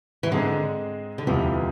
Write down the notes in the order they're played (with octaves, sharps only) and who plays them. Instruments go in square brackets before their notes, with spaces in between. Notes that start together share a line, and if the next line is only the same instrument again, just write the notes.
[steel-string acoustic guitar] E3
[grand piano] G#2 G#3 C4 G#4 [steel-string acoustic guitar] D3
[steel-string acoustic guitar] D3
[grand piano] E1 D2 C3 F3 [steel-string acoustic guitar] E3